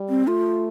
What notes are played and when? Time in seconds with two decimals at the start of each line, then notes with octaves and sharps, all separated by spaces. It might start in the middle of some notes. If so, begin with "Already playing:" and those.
Already playing: G3
0.09 C4
0.27 A3 F4